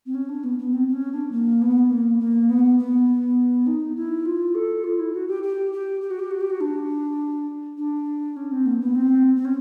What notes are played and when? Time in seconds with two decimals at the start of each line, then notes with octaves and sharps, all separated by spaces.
0.06 C4
0.14 C#4
0.28 D4
0.43 B3
0.58 B3
0.73 C4
0.88 C4
0.92 C#4
1.12 D4
1.31 A#3
1.61 B3
1.90 A#3
2.19 A#3
2.49 B3
2.78 B3
3.66 D#4
3.95 E4
4.25 F4
4.54 A4
4.84 F4
4.99 E4
5.13 F#4
5.27 G4
5.43 G4
5.72 G4
6.01 G4
6.10 F#4
6.19 G4
6.30 F#4
6.40 G4
6.49 F#4
6.60 D4
7.77 D4
8.36 C#4
8.51 C4
8.65 A#3
8.80 B3
8.95 C4
9.36 C4
9.44 C#4